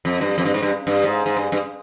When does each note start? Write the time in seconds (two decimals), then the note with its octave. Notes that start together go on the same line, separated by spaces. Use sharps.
0.05 F2
0.21 G2
0.38 F2
0.45 G2
0.54 G#2
0.62 G2
0.87 G2
1.03 G#2
1.26 G#2
1.37 G2
1.52 G2